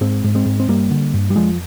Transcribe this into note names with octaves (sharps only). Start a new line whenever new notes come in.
G#2 G#3 C4
G#2
G#3 C4
G#2
C4
G2 G3 A#3
D3
G2
G3
F2 F3 G#3